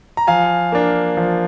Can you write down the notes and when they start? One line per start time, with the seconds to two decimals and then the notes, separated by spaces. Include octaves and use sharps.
0.17 A#5
0.27 F3 F5 G#5
0.72 A#3 D4
1.17 F3